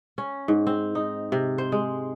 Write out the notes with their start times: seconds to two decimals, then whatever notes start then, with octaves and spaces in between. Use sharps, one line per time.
0.18 C#4
0.48 G#2
0.67 C4
0.95 D#4
1.32 C3
1.58 C5
1.72 G#3